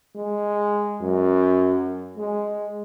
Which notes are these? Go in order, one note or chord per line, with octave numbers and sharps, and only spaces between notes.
G#3
F#2
G#3